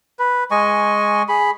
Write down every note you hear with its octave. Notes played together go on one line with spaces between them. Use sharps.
B4
G#3 D#5 G#5 C#6
G#4 B5